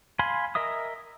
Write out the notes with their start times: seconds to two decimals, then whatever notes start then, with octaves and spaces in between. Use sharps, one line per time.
0.19 F5 G#5 B5 C6
0.55 A#4 D#5 E5 D#6